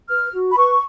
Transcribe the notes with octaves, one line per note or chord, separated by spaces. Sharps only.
B4 F6
F#4
B5
B4 C#6